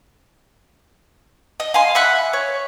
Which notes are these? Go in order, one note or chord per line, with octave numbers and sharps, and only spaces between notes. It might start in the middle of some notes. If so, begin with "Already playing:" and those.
D#5
F5 G#5 C6
E5 F#5 B5 F#6
C#5